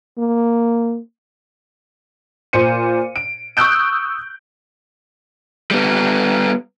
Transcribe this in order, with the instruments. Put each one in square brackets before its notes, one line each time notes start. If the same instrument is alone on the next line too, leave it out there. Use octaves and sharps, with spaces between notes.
[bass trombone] A#3
[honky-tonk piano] A#2 C5 C#7 D#7
D7
C#6 D#6 E6 F#6 G6 D7
[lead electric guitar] G3 B3